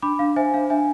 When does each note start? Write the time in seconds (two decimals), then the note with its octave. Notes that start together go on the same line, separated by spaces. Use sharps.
0.02 D4 B5 D6
0.19 D4 F5
0.36 C5 E5 G#5
0.54 D4 F5
0.70 D4 E5 G#5